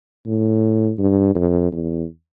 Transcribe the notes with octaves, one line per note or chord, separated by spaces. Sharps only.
A2
G2
F2
E2